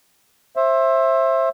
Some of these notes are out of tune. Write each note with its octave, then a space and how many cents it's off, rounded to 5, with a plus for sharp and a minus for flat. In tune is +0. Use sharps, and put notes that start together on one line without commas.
C5 +30 E5 +5